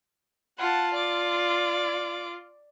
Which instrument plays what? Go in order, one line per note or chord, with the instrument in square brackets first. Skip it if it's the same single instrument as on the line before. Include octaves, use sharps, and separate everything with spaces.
[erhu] F4 [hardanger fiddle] F#5 A5
[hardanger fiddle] D5 D6